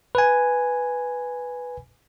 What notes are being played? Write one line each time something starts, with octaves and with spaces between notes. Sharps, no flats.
B4 G#5